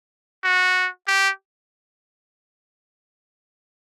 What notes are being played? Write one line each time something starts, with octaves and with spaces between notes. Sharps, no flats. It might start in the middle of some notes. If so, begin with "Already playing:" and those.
F#4
G4